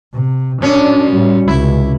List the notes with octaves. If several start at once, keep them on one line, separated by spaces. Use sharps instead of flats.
C3
F#2 C#4 D4
A2 G3
C#2 C3 E4